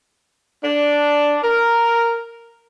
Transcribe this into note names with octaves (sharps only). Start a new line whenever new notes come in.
D4
A#4